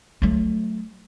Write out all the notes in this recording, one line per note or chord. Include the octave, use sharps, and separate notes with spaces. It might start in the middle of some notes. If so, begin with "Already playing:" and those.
F#3 A3